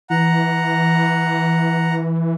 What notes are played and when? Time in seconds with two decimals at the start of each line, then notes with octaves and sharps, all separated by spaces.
0.10 E3 F#5 A#5